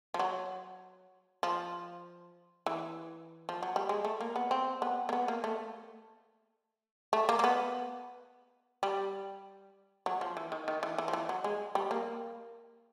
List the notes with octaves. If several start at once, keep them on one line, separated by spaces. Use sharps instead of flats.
F3
F#3
F3
E3
F3
F#3
G3
G#3
A3
A#3
B3
C4
B3
A#3
B3
A#3
A3
A3
A#3
A#3
B3
G3
F#3
F3
E3
D#3
D#3
E3
E3
F3
E3
F#3
G#3
G3
A#3